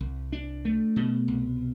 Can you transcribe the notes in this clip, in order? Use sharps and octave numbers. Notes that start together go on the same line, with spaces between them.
C2
D4
A3
B2
C2